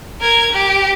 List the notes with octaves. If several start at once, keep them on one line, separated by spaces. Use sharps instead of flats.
A#4 G#6
G4